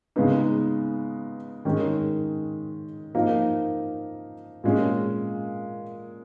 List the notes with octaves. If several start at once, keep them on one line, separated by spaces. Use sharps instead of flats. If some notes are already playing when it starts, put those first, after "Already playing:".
C#3 G#3 B3 D#4
D#3 G#3 C#4
F3 A#3 D#4
A#2 G#3 C#4